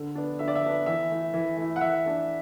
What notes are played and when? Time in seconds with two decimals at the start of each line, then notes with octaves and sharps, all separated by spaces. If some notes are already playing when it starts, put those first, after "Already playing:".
Already playing: D3
0.15 B3 D4
0.39 D3 E5
0.48 D5
0.55 E5
0.63 B3 D4
0.86 E3 E5
1.10 A3 E4
1.34 E3
1.57 A3 E4
1.76 F#5
1.81 E3 E5
2.05 A3 D4